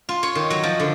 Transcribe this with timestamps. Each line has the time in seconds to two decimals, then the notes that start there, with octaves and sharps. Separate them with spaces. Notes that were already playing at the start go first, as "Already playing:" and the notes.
0.09 F4
0.23 C#5
0.35 D#3
0.50 F#3
0.63 F3
0.80 D3